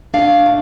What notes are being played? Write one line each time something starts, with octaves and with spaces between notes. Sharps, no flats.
D4 F5
A3